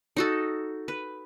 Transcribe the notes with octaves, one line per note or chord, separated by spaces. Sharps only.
D#4 F#4 A4
B4